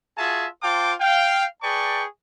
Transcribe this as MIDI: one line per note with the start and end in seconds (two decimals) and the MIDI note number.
0.18 0.47 65
0.18 0.47 66
0.18 0.47 68
0.18 0.47 76
0.18 0.47 80
0.18 0.47 81
0.63 0.93 65
0.63 0.93 72
0.63 0.93 77
0.63 0.93 79
0.63 0.93 81
0.63 0.93 86
1.00 1.44 77
1.00 1.44 79
1.63 2.04 68
1.63 2.04 71
1.63 2.04 74
1.63 2.04 79
1.63 2.04 81
1.63 2.04 85